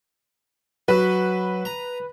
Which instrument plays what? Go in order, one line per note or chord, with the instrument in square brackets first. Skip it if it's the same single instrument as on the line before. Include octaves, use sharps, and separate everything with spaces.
[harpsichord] F#3 [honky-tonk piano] B4
[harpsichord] A#5